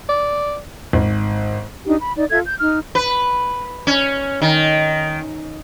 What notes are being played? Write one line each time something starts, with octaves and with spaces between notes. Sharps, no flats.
D5
G#1
D4 D#4 G4
B5
D#4 D5
F4 A4 E5 G#6
G6
D#4 F6
B4
C#4
D#3